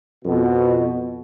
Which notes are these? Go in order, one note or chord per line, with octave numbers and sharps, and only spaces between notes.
F2 B2